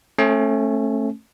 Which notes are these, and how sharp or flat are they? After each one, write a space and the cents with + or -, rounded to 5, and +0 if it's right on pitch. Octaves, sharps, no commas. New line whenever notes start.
A3 +0 C#4 -35 G#5 +40